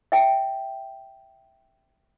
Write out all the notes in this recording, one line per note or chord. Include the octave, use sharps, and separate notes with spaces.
E5 G5